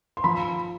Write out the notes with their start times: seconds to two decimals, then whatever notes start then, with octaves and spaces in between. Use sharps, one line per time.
0.17 C6
0.24 F3 B5